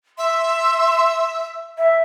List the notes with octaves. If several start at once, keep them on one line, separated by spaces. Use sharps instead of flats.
E5 C6
E5